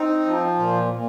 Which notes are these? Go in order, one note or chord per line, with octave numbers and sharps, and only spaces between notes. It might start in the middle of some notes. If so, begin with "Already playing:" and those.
Already playing: C4 D#4
F3
A#2
A#2